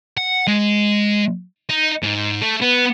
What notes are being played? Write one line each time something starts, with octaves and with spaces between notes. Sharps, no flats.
F#5
G#3
D#4
G#2
A3
B3